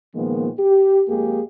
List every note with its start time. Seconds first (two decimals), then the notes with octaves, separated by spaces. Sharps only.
0.15 A#2 D#3 F3 G#3 A#3 B3
0.58 G4
1.08 F2 G#3 A#3 G4 G#4